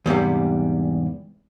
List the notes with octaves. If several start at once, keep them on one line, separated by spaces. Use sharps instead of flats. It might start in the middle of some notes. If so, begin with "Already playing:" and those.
E2 G#2 C3 G3